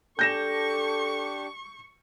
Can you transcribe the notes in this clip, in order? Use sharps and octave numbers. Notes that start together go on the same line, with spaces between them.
D4 G4 A4 C#6 G6 A#6 E7